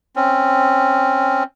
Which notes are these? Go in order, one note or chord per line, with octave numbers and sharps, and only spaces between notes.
C4 C#4